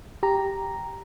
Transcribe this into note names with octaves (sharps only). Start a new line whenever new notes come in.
G4 A#5